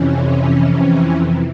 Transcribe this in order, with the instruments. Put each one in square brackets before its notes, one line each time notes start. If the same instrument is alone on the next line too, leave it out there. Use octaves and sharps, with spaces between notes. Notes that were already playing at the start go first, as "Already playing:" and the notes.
Already playing: [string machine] F2 C3 E3 C#4